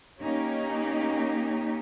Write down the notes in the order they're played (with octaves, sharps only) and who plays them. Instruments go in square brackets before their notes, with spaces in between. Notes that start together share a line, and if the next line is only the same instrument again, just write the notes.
[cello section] A#3 C#4 D#4 G4